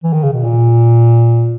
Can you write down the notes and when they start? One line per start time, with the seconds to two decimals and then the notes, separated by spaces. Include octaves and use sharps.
0.04 E3
0.13 D#3
0.23 C#3
0.33 B2
0.43 A#2